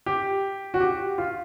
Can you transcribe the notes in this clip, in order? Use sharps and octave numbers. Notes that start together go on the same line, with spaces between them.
G4
F#4
G4
F4